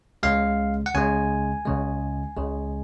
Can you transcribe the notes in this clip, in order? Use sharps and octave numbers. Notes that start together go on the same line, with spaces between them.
C#2 C#3 G#3 F5
F#5
C#2 C#3 G#3 G#5
C#2 C#3 G#3
C#2 C#3 G#3